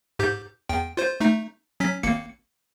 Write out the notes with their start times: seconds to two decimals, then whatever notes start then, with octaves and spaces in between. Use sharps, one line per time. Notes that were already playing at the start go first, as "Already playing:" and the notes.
0.19 G#2 G4 G6
0.69 E2 G5
0.97 F4 C5
1.20 A3 D#4
1.80 F#3 C#4 B6
2.03 G#1 A#3 C#7